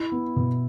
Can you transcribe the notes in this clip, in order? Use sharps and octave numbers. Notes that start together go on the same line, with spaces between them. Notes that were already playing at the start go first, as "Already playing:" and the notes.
Already playing: E4
B3
B2